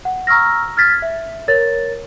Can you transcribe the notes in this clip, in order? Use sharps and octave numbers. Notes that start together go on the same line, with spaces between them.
F#5
A#5 C#6 E6 F6 A#6
F6 G#6 A6 B6
E5
A#4 C#5 A6